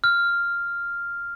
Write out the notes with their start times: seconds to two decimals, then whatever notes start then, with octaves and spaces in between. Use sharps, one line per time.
0.04 F6